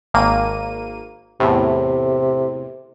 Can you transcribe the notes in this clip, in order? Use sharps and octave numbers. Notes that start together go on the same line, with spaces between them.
G#1 A#3 D#7
E2 A2 C3